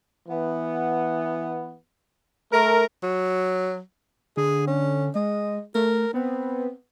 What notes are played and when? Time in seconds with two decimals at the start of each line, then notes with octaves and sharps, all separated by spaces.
0.29 E3 B3
2.52 A3 A#4
3.03 F#3
4.37 D3 G#4
4.67 C#4
5.15 G#3 D#5
5.75 A3 A#4
6.14 B3 C4